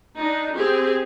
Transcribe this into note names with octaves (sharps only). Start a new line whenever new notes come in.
D4 D#4
C4 G4 G#4